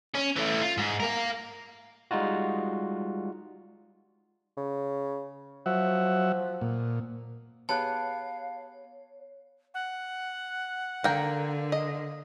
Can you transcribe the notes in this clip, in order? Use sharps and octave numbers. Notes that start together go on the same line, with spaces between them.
C#4
E3 A3
F4
G#2
A#4 F5
G3 G#3 D#4 F4 F#4
C#3
F3 F#3 E5 F#5
A#2
B3 G4 G#4 C#5 F5 A5 F#6
F#5
D3 A#3 A#4 G5
D#5